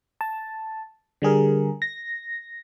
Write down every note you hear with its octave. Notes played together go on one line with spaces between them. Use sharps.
A5
D3 G3 G#4 A#4
A#6